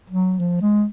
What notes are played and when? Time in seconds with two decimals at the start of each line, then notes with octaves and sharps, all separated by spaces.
0.10 F#3
0.39 F3
0.62 G#3